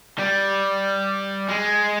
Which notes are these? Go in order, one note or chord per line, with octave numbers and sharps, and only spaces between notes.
G3
G#3